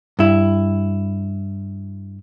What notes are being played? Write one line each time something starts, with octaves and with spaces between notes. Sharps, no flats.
G2 E4